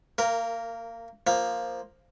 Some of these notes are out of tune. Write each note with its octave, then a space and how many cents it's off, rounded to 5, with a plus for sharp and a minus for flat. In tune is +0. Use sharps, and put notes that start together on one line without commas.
A#3 -25 A#4 +0
F3 +0 A#3 +0